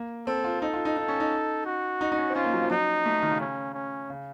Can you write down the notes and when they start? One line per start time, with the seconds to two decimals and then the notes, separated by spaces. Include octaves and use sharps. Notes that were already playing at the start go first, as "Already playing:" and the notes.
Already playing: A#3
0.27 C4 A4
0.44 F4
0.61 D#4 A4
0.73 F4
0.85 D#4
0.97 D#4
1.08 C#4
1.20 D#4
1.66 F#4
2.01 D#4
2.12 D#4
2.18 C#4
2.30 C4
2.35 C#4 F4
2.44 A#3
2.53 F#3
2.62 F3
2.70 F#3 D#4
3.05 A3
3.23 D#3
3.31 C#3
3.41 C#4
3.74 C#4
4.10 C#3